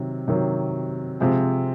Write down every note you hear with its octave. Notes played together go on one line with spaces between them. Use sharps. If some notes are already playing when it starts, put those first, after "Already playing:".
Already playing: C3 D#3 F#3
C3 D#3 F#3
C3 F3 G#3 C4